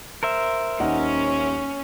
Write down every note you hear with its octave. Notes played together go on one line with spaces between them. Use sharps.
A#4 C5 E5
D#1 C#4 D#4 F#5